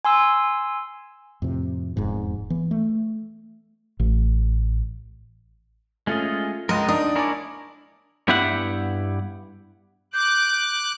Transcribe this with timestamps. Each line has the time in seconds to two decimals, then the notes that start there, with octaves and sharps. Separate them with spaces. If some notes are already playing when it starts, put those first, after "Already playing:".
0.05 G#5 C6 E6
1.42 F2 A2 C3
1.96 E1 F2 G#2 F3
2.50 E3 B3
2.71 A3
4.00 A1
6.07 G#3 A3 C#4 F4 D#5
6.69 C#2 G#3 A#4 D#5 A#5
6.88 D4 D#4 D#6
7.16 E4 A#4 C#5 D5 G#5
8.28 G2 B3 E4 G4 E5 F#5
10.14 D6 F#6 G6